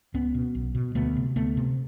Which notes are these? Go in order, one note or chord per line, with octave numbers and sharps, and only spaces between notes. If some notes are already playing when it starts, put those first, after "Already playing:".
C#2 B3 C#4
B2
B1
B2
D2 A3 B3
C3
D2 A3 B3
C3